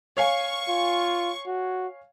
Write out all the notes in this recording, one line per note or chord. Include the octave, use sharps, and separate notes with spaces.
C#5 F5 G#5 C#6
F4
F#4